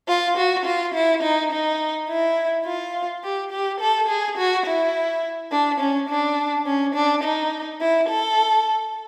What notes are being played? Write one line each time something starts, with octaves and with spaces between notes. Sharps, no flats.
F4
F#4
F4
E4
D#4
D#4
E4
F4
G4
G4
A4
G#4
F#4
E4
D4
C#4
D4
C#4
D4
D#4
E4
A4